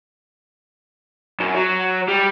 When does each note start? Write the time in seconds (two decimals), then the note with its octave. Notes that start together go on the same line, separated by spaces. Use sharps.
1.40 F#2
1.55 F#3
2.08 G3